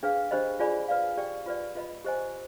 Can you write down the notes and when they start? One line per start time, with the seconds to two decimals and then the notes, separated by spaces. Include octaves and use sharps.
0.03 D4 G#4 B4 F5
0.31 D4 G4 C5 D#5 B5
0.59 F4 G#4 D5 G#5 B5
0.88 B4 D5 F5
1.17 G4 D5 G5
1.46 F4 B4 D5
1.75 F4 B4 D#5 B5
2.05 G4 C5 D#5 G#5